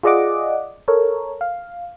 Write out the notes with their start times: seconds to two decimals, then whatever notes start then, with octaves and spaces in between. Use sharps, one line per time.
0.03 F4 G#4 D5 D#5 F#5 D6
0.88 A4 A#4 C#5
1.41 F5